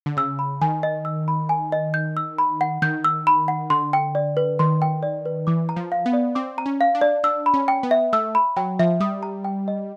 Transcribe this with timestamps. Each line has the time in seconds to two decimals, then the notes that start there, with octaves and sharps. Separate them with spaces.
0.06 D3
0.17 C#3 E6
0.39 B5
0.61 D#3 G#5
0.83 D#5
1.05 E6
1.28 B5
1.49 G#5
1.72 D#5
1.94 G6
2.17 E6
2.38 B5
2.61 F#5
2.82 D#3 G6
3.04 E6
3.27 B5
3.48 F#5
3.70 D3 C6
3.93 G5
4.15 D5
4.37 B4
4.59 D#3 C6
4.82 G5
5.03 D5
5.26 B4
5.47 E3 D6
5.69 A#5
5.76 F3
5.92 F5
6.06 B3
6.13 D5
6.35 C4 D6
6.58 A#5
6.66 C#4
6.81 F5
6.95 D4
7.01 D5
7.24 D4 E6
7.46 B5
7.54 C#4
7.68 G5
7.83 B3
7.91 E5
8.13 A3 E6
8.35 B5
8.56 F#3 G5
8.79 F3 E5
9.00 G3 D#6
9.23 A#5
9.45 G5
9.68 D#5